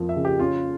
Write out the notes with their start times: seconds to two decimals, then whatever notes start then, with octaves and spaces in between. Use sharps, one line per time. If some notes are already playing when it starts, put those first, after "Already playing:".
Already playing: F2 F3 A#3
0.09 E5
0.16 C#3
0.25 G4
0.39 C#4 F4